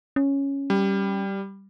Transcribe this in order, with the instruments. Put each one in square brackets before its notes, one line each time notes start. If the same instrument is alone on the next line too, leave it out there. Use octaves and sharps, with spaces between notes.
[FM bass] C#4
[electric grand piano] G3